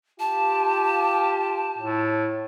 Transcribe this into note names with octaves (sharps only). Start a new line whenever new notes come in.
F4 G4 A5
A2